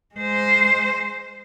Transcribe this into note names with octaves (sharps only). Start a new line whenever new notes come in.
G#3 C5